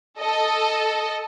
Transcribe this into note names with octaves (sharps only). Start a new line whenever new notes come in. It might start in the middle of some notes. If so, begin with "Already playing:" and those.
A4 D#5